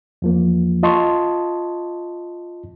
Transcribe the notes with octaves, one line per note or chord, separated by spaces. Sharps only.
E2 F3 A#3
F4 D#5 A5 C6 C#6